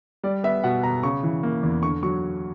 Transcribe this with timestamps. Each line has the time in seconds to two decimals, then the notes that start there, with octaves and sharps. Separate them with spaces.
0.23 G3 D5
0.44 B3 E5
0.64 B2 F#5
0.83 B2 A#5
1.03 C#3 C#6
1.23 E3
1.43 A#3
1.63 E2
1.83 D3 C#6
2.03 F#3 C#6